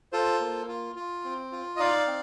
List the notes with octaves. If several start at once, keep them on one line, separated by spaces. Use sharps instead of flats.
F4 A4 C5
A#3
F4
F4
C4
F4
D#5
D#4 D5 F5
C4